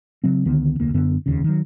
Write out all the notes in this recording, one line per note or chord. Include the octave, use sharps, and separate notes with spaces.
C#3 F#3 C4
C#2 D3 D#3 B3
F1 D2 A#3
F#2 D3 B3
F1 D#2 C#3
D#3 F#3